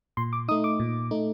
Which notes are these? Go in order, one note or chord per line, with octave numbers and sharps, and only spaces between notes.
A#2 C6
D6
A3 D#4 D#6
D6
A#2
A3 D#4